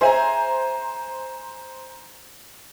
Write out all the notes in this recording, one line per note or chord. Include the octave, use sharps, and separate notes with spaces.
C#4 G#4 C5 E5 G#5 A#5